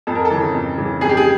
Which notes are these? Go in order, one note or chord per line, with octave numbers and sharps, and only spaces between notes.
F2 A4
A#4
A4
C#3 E3
F2
C#3 E3
F2 G#4
G4
G#4